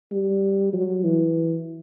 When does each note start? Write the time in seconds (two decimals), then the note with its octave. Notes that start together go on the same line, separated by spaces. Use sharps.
0.11 G3
0.73 F#3
1.04 E3